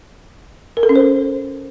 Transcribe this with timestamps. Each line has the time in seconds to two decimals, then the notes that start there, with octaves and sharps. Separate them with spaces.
0.77 A#4
0.83 A4
0.89 C#4
0.96 C5